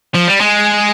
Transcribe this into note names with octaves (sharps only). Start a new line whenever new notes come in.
F3
G3
G#3